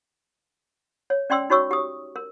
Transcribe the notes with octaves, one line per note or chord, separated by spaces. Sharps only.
C#5
C#4 D5 G5 C6 E6
D#4 F#4 C#5 C#6 E6
G4 D#6
A#4